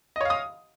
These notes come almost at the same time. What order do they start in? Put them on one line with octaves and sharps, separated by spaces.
D#5 C#5 F5 D#6